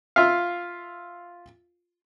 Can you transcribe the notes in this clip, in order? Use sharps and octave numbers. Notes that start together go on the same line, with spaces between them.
F4 E5 F5